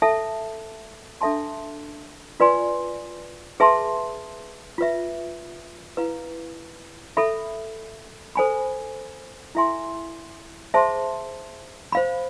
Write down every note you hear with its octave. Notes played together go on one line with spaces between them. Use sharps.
A4 E5 A5
D4 A4 E5 A5 C6
F4 B4 D5 G#5 C6
G#4 B4 E5 A5 C6
F4 B4 E5
E4 B4 F5
A4 E5 B5
A4 C5 G#5 B5
E4 A4 E5 G#5 C6
G#4 C5 E5 A5 C6
C5 F5 B5